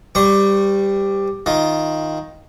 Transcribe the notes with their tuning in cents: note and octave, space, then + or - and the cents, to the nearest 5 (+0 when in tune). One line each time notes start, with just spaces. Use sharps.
G3 +5 C5 -35 C#6 +0
D#3 +5 F4 +0